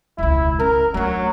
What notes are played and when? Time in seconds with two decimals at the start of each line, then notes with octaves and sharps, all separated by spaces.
0.18 E1 C#2 E4
0.60 C#4 A#4
0.94 F#3 A3 D4